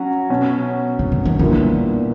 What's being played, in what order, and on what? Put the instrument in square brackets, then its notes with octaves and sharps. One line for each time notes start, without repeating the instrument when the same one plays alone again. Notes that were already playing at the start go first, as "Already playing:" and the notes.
Already playing: [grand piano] F#3 C#4 F#4
B2 F#3 C#4
[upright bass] C#3
D3
E3
[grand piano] A#2 G3 B3 E4 A#4 [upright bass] D3